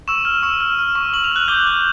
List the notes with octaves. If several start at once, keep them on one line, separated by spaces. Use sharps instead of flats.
C#6 E6 E7
F6
C#6 E6 E7
F6
F6
C#6
C#6 F#7
F7
F6 F#6 F#7
D6 G6 G7
F#6